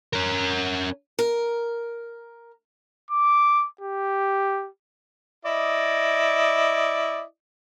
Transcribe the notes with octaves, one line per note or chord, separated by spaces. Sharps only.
C#4 A#4
A#4
D6
G4
E4 D5 D#5